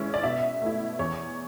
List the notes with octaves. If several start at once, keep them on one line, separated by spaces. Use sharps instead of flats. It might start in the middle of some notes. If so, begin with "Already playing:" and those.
Already playing: G#3 C#4 E4
D5
B2 E5
A3 E4
E2 C#5